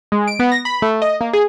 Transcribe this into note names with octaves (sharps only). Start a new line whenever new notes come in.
G#3
D7
B3
A#6
B5
A3
D#5
A#3
G#4